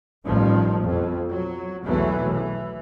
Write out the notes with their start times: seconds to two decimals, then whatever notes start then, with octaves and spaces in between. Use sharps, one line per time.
0.24 A1 G2 D#3 F3
0.82 F2 B2
1.30 F#3
1.85 B1 E2 B2 E3 F#3 A3
2.32 E3